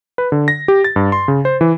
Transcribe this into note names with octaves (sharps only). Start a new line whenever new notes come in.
B4
D3
A#6
G4
A6
G2
C6
C#3
C5
E3